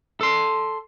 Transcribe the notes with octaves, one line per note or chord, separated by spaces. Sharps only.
A4 C6